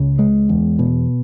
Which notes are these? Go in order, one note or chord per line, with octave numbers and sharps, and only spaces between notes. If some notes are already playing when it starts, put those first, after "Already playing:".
Already playing: C#2 C#3
G#3
E2
B2